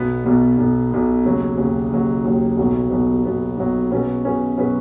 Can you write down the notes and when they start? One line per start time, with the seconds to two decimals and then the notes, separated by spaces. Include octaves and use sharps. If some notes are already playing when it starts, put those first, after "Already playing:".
Already playing: B1 B2 B3
0.25 B1 B2 B3
0.58 B1 B2 B3
0.91 B1 B2 B3
1.24 D#2 C#3 F#3
1.57 D#2 C#3 F#3
1.91 D#2 C#3 F#3
2.24 D#2 C#3 F#3
2.57 B1 B2 F#3 B3
2.91 B1 B2 F#3 B3
3.25 B1 B2 F#3 B3
3.57 B1 B2 F#3 B3
3.91 B2 F#3 C#4 G#4 B4
4.24 B2 F#3 C#4 G#4 B4
4.58 B2 F#3 C#4 G#4 B4